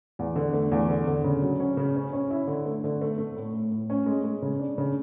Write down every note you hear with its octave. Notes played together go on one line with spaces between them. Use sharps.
E2
D3
A3
E2
D3
D3
C#3
F#3
C#4
C#3
C#4
C#4
E4
D3
A3
D3
A3
A3
A2
A2
A2
C#4
G#3
G#3
C#3
D4
C#3